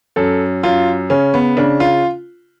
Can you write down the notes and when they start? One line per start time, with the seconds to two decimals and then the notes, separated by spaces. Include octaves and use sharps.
0.16 F#2 A4
0.63 F#2 F4
1.10 C#3 C#4
1.34 B3
1.57 C#3 D4
1.80 F4